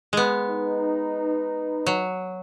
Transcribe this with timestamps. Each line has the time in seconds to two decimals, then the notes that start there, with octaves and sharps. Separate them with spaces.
0.13 G#3 B3
0.49 D#4 B4
1.86 F#3